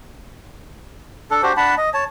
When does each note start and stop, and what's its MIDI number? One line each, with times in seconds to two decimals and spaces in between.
1.31 1.42 62
1.31 1.42 69
1.43 1.53 62
1.43 1.53 66
1.43 1.53 67
1.43 1.53 72
1.57 1.75 62
1.57 1.75 78
1.57 1.75 81
1.57 1.75 83
1.78 1.90 75
1.94 2.04 73
1.94 2.04 81